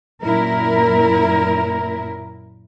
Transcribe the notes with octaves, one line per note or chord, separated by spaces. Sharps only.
F#2 A#2 E4 A#4